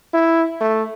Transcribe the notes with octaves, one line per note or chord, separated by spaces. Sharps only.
E4
A3